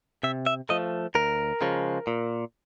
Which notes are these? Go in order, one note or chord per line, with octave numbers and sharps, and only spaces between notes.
C3 E5
E5
F3 A3 D#5
D2 A#4
C#3 F3 G#3
A#2